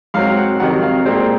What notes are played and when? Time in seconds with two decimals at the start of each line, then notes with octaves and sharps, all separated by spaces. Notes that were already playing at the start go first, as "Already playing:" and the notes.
0.14 G#2 F#3 C4 F5
0.36 F#5
0.60 F2 C3 D#3 F#3 F#5
0.82 F5
1.05 A#2 G#3 C4 C5